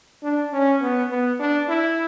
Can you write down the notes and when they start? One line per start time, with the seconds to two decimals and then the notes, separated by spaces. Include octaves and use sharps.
0.23 D4
0.53 C#4
0.82 B3
1.11 B3
1.40 D4
1.69 E4